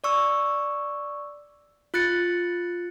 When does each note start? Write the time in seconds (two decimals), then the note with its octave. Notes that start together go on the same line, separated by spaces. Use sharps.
0.04 D5 C#6 E6
1.94 F4 F#6 A6 C#7